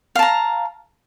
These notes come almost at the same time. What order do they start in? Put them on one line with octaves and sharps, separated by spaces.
F5 A5 A#5